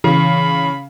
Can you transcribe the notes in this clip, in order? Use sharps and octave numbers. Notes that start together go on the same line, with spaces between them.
C#3 E3 B5